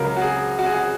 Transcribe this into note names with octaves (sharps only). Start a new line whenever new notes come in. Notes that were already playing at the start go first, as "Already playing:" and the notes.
Already playing: C#2 C#3 F#3 A#4
F#4
G#4
F#4
G#4
F#4